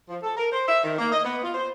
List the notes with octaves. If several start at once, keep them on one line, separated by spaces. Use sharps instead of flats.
F3
A4
A#4
C5
E5
D#3
A#3
D#5
B3
F4
C5